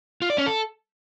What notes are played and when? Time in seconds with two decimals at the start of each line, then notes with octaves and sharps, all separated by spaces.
0.22 F4
0.30 D5
0.38 C#4
0.46 A4